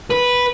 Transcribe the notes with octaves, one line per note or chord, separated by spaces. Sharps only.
B4